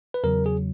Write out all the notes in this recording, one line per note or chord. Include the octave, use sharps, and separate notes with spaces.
B4
E2 C#3 F#3 A#4
G#4